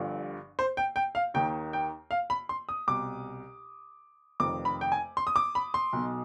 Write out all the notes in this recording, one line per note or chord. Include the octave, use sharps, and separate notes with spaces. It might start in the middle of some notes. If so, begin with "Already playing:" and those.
Already playing: G1 G2 D3 F3
C5
G5
G5
F5
D#2 D#3 G5
G5
F5
B5
C6
D#6
C2 B2 D6
F1 F2 D#3 D6
B5
G5
G#5
C6
D#6
D6
B5
C6
B1 B2